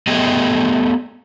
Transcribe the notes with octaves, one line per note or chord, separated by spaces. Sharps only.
A3 B3 G4 G#4 D#5